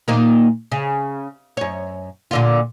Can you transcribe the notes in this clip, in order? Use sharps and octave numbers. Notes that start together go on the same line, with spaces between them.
A#2 D#3 A#3
C#3
F#2 C#5
A#2 D3 F4